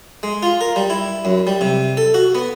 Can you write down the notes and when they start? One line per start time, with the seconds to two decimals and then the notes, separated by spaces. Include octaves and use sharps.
0.23 G#3
0.43 F4
0.61 A#4
0.76 G3
0.90 E4
1.25 F#2
1.47 G3
1.61 C3
1.97 A4
2.14 F#4
2.35 B3